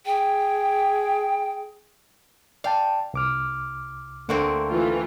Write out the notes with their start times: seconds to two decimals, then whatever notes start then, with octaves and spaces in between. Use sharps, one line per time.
0.06 G#4 G5
2.64 D5 F5 G5 A5
3.14 C2 D6 F6
4.29 D2 D3 A3 A#3 C4 C#6
4.69 E3 F4